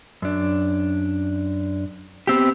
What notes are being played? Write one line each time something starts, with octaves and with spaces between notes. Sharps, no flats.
F#2 D4
B3 C4 G4